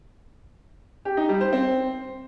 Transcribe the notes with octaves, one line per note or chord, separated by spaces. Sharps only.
G4
D#4
G3
C5
C4